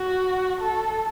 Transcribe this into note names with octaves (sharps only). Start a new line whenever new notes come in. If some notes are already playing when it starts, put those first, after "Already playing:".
Already playing: F#4
A4